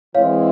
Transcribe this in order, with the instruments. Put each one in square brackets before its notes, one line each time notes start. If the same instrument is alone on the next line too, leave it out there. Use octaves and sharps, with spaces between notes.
[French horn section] E3 G#3 C4 E4 [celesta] C#5 F5